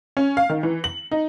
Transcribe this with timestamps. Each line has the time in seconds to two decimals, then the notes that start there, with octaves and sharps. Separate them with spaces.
0.17 C#4
0.37 F5
0.50 D#3
0.63 E3
0.84 F#7
1.11 D#4